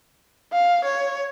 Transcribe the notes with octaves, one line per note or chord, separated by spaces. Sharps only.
F5
C#5